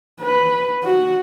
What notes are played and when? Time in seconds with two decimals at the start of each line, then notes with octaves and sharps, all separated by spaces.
0.21 B4
0.83 F#4